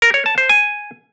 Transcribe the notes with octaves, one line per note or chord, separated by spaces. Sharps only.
A#4
C#5
A5
C5
G#5